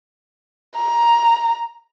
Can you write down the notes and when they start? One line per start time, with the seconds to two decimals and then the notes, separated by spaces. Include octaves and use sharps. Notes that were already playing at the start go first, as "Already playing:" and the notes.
0.75 A#5